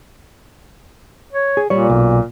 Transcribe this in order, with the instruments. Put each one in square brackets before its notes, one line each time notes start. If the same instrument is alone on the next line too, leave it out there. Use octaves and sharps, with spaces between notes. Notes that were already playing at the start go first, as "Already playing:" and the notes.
[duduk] C#5
[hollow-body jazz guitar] G#4
[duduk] A#2 [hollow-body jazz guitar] G3 C#5
[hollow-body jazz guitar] B1